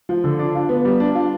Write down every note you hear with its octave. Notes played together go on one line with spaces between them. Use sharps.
F3
D3
D4
F4
B3
G3
D4
F4